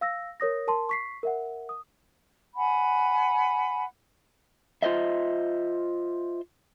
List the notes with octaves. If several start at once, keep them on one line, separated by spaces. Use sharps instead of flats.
F5 E6 A#6
A#4 C#5 D#6 A#6
A#4 A5 C6
C#6 B6 C7
A#4 E5 F#5
D#6
F#5 G#5 B5
F4 C5 D#5 E5